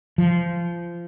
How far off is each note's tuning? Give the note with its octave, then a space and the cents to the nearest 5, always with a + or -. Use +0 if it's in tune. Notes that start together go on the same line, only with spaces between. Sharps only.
F3 -20